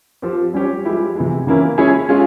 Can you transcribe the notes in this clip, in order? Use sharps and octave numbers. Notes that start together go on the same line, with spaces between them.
F3 C4 G4
G3 C#4 G4 C#5
F3 G#3 E4 G4
C3 E3 G#3
C#3 E3 A#3 C#4 E4
G#3 C#4 E4 G#4 C#5
G#3 C#4 F4 G#4